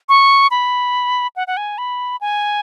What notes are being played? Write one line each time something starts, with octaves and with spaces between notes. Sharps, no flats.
C#6
B5
F#5
F#5
G#5
B5
G#5